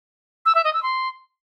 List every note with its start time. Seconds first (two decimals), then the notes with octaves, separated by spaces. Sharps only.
0.46 E6
0.55 E5
0.64 D#5
0.74 E6
0.83 C6